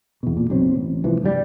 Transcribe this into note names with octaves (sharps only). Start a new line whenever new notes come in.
E2 B2
A#2
F#1 B1 F#3 C4
A1
C2 E3 F3
F1 G2 B2 G3